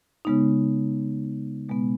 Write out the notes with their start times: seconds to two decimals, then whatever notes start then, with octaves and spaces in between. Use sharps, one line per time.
0.25 C#3 G#3 B3 D#4
1.69 B2 G#3 B3